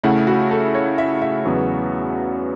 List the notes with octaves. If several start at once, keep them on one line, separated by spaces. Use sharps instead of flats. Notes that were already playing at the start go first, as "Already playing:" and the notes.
C#3 A3 E4 F#5
F#4
A4
C#5
E5
E5
E2 C#3 F#3 B3